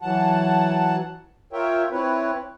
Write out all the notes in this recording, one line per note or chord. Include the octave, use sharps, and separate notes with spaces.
E3 F#3 F#5 A5
F4 A#4 C#5 E5 G5
C4 E4 B4 C#5